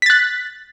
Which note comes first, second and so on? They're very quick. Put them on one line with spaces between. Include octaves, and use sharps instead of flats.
B6 A6 F#6